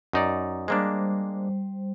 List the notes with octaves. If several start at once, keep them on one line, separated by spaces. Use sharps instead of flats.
F#2 D#4 D5
G3 G#3 A#3 D4 C5